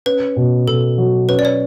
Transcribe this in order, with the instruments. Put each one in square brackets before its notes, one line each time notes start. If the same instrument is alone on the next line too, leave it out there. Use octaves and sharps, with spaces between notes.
[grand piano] C#4 [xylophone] B4
[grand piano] B2
[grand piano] B2 [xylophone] A4
[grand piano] F#3
[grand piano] C#4 [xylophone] B4
[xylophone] D5
C#5